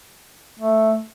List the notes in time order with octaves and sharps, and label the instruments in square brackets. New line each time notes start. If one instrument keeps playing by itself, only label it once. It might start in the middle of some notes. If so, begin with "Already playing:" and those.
[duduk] A3